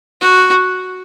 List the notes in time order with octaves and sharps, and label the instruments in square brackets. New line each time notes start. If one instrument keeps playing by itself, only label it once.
[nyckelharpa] F#4